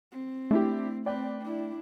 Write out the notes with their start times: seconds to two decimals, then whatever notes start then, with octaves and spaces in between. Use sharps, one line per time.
0.12 C4
0.51 A3 D4 E4 G4
1.06 C4 B4 D5 G5
1.42 D4 E4